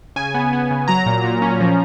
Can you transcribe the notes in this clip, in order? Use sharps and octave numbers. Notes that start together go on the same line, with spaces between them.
C#3 G#5
B3
B3
C#3
F#3 A#5
A#2
A#2
C#4
F3